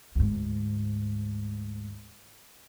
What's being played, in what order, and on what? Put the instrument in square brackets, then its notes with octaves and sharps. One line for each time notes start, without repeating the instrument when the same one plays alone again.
[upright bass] D2 G#2